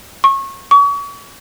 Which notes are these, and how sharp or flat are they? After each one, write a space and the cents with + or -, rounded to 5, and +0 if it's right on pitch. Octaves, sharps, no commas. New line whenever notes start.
C#6 -25
C#6 +35